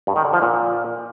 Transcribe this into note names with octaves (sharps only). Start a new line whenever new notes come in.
G2
D#3
D3
F3
A#2